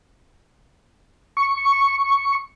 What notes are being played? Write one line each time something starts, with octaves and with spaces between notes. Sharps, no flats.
C#6